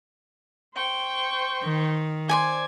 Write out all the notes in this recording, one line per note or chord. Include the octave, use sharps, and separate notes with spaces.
C5 G5 C#6
D#3
C5 D5 G#5 G#6